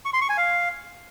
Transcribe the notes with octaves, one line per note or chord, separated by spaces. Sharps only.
C#6
C6
C#6
G#5
F5